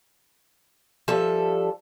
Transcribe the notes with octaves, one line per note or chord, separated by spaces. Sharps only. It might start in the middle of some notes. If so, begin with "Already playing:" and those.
F3 G3 A4 E5